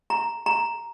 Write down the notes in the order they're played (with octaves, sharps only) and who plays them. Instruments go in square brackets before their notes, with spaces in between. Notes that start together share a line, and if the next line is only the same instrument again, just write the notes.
[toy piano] A#5
A#5